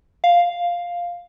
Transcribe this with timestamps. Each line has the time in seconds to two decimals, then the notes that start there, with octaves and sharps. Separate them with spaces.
0.24 F5